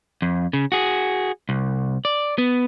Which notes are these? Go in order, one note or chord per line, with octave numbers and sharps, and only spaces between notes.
F2
C#3
F#4 G#4
C2
D5
B3